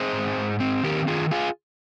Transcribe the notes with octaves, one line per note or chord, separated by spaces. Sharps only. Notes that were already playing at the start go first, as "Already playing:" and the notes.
Already playing: C4 G#4 C5
G#2
G#2
C4
D#3 G4 A#4
D#3 F4 G#4
F4 G#4